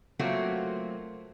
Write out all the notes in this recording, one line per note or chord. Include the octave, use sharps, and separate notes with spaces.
F#3 A3 A#3 C4 F4 F#4